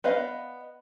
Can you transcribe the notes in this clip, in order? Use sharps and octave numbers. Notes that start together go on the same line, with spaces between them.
B3 B4 D5 D#5 F5